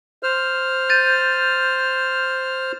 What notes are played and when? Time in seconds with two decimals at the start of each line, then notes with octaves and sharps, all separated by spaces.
0.23 C5 F6
0.89 G6 A6 D#7